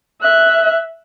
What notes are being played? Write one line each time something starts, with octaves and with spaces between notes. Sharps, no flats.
E5 F#6